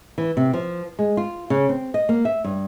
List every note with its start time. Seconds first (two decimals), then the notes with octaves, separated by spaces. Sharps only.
0.18 E3
0.37 C3
0.54 F3
0.99 G#3
1.17 F4
1.50 C#3
1.69 C4
1.94 D#5
2.09 A#3
2.25 E5
2.44 G2